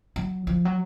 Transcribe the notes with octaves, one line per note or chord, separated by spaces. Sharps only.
F#3
F3
F#3